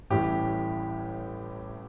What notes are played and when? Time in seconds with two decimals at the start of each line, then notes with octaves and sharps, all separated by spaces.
0.10 A1 A2 E3 G3 G4